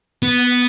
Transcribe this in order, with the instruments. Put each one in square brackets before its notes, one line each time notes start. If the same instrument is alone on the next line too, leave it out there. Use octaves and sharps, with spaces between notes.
[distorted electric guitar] B3